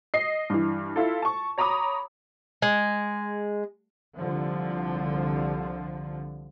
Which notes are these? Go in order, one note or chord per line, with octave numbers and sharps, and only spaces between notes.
D#5 C7
G2 E3
E4 F4 A4
A5 C#6
C#5 A#5 B5 D6 D#6
G#3
C2 D3 F3